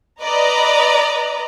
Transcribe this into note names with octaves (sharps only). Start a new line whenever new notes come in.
B4 D5 D#5 A#5